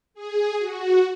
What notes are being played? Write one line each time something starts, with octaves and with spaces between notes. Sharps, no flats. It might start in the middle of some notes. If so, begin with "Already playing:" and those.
G#4
F#4